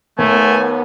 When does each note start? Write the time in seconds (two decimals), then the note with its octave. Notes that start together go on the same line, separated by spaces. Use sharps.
0.19 D#2 A3 B3 G#5